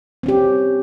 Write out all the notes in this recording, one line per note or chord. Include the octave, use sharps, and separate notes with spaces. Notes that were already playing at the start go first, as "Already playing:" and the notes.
C4 C#4 G4